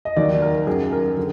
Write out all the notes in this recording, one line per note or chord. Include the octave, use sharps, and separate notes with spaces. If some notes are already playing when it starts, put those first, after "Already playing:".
D#5
D#2 D#3 F#3 D5
A#4
F#2 D#3 F#3 G#4
A#4
D3 F#3